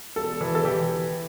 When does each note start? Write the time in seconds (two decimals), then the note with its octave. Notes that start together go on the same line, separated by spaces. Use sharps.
0.16 E1 A4
0.41 E3
0.55 A4
0.65 E3 G4